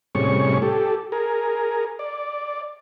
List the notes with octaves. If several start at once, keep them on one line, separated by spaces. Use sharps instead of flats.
A2 C3 G3 C#4 G#4 C#6
G4 A4
G#4 A#4
D5